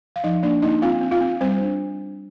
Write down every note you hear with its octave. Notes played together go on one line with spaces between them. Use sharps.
F5
F3 D#4 D#5
A#3 D4 D5
A#3 D#4 D#5
C4 F4 F5
C4
F4 F5
C4
G3 C4 C5
D4